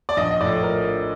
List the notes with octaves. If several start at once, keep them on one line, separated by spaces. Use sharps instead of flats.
D5
A#1 D#5
D#5
A2 F3 D5
A#4